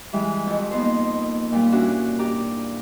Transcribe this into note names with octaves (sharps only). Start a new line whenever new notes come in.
E3 G3 G#3
F2
A#3 B3 D#4 C5
A#2 G3
C#4 D4 E4 F#4
G4 D5 A#5